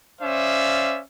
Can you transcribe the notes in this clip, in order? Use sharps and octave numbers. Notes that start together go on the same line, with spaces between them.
C#4 C5 D5 E5 F5